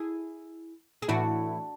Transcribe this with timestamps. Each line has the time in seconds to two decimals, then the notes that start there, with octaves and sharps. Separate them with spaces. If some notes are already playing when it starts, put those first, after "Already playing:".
Already playing: E4 G#4
1.02 G#4
1.08 A2 E3 A3 D4 E4 F#4